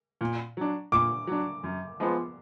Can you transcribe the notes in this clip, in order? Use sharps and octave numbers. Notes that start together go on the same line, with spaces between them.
A#2
F#3 D4
A#2 D6
F#3 D4
F#2
F3 G#3 B3